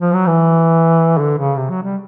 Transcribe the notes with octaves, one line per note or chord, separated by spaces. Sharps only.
F3
F#3
E3
D3
C#3
C3
F#3
G3